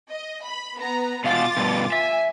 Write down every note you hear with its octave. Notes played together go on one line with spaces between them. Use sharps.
D#5
B5
B3 A#5
B2 F4 F5 D6 A6
G2 B2
E5 G#5